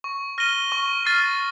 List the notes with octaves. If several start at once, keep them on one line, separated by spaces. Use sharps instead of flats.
C#6
F6 A#6 D#7 G7
C#6
F6 A6 C7